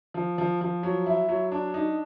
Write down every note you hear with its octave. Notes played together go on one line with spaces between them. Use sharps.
F3
F3
F3
F#3
E4
F#3
D4
D#4